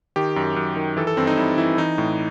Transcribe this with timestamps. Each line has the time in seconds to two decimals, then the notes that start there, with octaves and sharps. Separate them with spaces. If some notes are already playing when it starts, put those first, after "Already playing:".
0.16 D#3 G4
0.36 F#2
0.56 F#2
0.76 D#3
0.97 E3 A4
1.07 A4
1.17 G2 C4
1.27 D#4
1.37 G2 E4
1.58 E3 E4
1.78 E3 D#4
1.98 A2